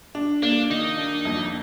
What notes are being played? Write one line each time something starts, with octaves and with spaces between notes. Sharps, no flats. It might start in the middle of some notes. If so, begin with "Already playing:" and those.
D4
A#3 D4
D#3 D#4
D4
F2